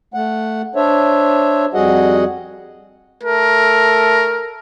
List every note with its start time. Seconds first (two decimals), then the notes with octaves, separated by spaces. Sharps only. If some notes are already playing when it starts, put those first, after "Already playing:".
0.14 A3 F#5
0.75 D4 C5 C#5 E5
1.74 F2 G3 F#4 G#4 D#5 F#5
3.23 A3 A#4